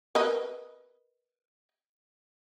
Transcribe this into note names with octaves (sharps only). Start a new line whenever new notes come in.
A#4 B4 D#5